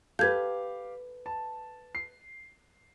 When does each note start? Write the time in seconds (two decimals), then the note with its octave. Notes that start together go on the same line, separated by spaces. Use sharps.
0.19 G4 A4 B4 F5 G6 G#6
1.26 A5
1.95 C7